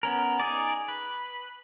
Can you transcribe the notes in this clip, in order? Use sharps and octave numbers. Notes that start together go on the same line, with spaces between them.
B3 C#4 A#4
D#4 G#4 D5
B4